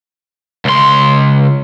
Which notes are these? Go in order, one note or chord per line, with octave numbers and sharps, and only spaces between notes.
C#2 C6